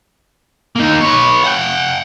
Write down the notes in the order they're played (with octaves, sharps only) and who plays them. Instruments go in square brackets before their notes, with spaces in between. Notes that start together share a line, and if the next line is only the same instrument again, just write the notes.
[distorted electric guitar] A#3 D#4
B4 C#5
F#5 G5